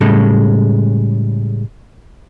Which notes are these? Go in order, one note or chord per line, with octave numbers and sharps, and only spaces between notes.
A2 C#3 G3 G#3 A4